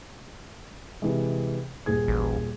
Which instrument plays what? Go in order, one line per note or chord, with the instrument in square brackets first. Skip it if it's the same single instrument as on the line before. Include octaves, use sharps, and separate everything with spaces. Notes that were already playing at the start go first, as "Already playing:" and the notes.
[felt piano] C3 E3 G#3
D#1 G#4 G#6
[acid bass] A1